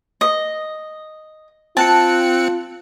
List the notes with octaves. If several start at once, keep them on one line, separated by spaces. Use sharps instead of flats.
D#5
C4 F4 A5 F#6 C#7